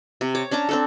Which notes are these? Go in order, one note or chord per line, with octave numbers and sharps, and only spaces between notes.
C3
C#5 D6
C#4 D4 A5 A#5
C4 D4 A4